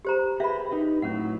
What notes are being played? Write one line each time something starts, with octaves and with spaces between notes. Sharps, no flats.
G4 C5 A#5
G4 G#4 B4 E5 B5
D#4 G4 B4
A2 F#3 C#4 F#5